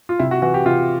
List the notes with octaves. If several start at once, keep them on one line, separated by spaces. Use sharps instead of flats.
F4
C3 E4
F#4
E3 F#4
G4
C3 F4